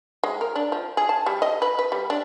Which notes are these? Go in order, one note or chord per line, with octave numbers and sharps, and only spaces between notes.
G#3
A#4
D4
F3
G#4
A5
G3
D#5
B4
B4
G3
D4